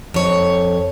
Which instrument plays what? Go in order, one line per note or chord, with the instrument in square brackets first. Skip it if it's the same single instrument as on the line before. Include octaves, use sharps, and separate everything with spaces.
[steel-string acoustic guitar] F2 C#5